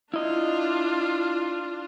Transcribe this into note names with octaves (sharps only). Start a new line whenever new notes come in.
D4 E4 F4 D#5